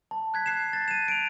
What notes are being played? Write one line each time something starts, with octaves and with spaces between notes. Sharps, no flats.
A5
F#6 G#6 B6
F#6 C7 E7
A6
D#7 E7
D7 F7